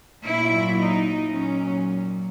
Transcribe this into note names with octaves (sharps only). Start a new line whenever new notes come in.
A#2 F#3 E4
D#4
A#2 F#3 C#4